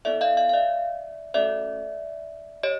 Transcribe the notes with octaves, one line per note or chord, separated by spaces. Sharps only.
B3 E4 A4 D5 E5
D#5 F5
D#5 F5
F5
D5 E5
A3 C#4 F#4 A4 D5 E5
G4 C#5 D#5